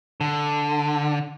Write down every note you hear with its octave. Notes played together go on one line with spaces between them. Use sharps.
D3